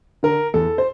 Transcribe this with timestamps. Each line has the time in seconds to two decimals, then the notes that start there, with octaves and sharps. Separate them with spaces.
0.23 D3 A#4
0.54 E2 A4
0.78 C5